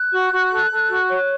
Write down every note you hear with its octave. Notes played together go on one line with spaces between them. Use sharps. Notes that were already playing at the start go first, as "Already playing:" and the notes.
Already playing: F#6
F#4
F#4
A4
A4
F#4
C#5